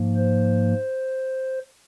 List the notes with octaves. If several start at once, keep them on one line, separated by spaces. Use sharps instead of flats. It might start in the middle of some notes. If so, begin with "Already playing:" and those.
Already playing: G#2 F3 A#3
C5